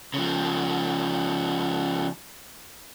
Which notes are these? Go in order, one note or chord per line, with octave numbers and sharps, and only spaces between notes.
C#3 F3